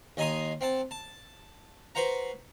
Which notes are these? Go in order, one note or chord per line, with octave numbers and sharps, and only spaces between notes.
D#2 D#5 G#5 A#5 C6 D#6
C4 F#5 A5
A5
F#4 B4 C5 F#5 A#5